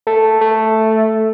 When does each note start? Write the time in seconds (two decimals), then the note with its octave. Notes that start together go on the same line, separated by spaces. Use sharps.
0.07 A3
0.41 A3